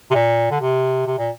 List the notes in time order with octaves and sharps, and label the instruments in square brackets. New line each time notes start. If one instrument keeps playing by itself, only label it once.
[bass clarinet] C3
A#2
D3
C3
C3
A#2